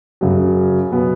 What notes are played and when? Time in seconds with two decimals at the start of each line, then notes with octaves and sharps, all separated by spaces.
0.21 F#2 C#3 F#3
0.91 B2 F#3 B3